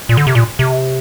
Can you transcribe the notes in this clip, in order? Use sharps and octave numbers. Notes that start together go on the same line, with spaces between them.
A#2
D3
C3
A#2
C3